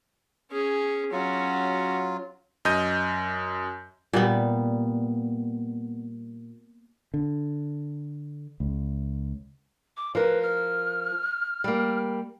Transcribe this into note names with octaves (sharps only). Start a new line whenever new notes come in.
C#4 G#4
F#3 C#4 F4 F#4
F#2 D#5 G6 D#7
A#2 G3 B3
D3
C#2
D6
F3 A#4 B4
F6
G3 A#3